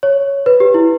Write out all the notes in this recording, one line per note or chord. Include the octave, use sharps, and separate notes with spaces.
C#5
B4
G4
E4